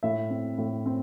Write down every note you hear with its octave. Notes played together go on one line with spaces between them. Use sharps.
A2 E5
C4
A2
C4